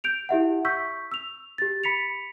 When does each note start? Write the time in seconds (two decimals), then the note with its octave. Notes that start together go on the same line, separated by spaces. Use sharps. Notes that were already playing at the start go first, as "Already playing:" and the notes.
0.04 G6 D7 F7
0.29 E4 G4 E5 F#5
0.65 C#6 E6 G6 B6
1.12 E6 F7
1.58 G4 A6
1.84 B5 B6 C#7 F7